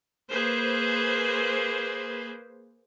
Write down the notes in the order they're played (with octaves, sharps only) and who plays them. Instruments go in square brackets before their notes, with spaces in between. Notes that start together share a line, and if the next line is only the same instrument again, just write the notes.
[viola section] A#3 G#4 B4 C5